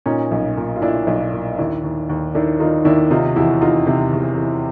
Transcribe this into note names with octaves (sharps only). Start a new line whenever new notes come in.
A#2 C#4 D#4
B1
A#2
F4
A#2 D4 E4
B1
A#2
D#2 D4 E4
D#2
D#2
D#3 D4 E4
D#3 D#4 F4
D#2 D4 E4
C3 D#4 F4
E2 E4 F#4
E3 D#4 F4
C3
E2
E3